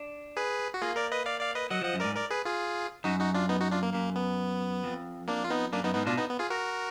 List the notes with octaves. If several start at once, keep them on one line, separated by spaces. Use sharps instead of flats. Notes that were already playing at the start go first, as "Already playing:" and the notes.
Already playing: D4
G#4 B4
F#4
A#3 F4 G#4
A#4 D5
B4 D#5
D5 F5
D5 F5
B4 D#5
F#3 D#5 F#5
F3 D#5 F#5
F#2
G#2 A#4 D5
A#4 D5
G#4 B4
F4 G#4
F#2 D#4 F#4
D#4 F#4
D4 F4
B3 D#4
D#4 F#4
D4 F4
A#3
F#2 A#3
B3
F2
A#3 D4
F4
B3 D#4
F#2 A#3 D4
F#2 B3 D#4
G#2 B3 D#4
B2 D4 F4
B3 D#4
B3
F4 G#4
F#4 A#4